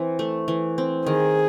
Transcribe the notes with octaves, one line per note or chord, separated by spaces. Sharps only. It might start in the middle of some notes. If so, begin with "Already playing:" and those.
Already playing: E3 C4
A3
E3
C4
D#3 G#4